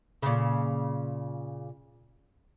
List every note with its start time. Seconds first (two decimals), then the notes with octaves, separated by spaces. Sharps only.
0.22 A#2 C#3